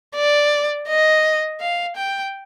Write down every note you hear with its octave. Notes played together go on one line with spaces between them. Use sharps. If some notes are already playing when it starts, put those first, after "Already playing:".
D5
D#5
F5
G5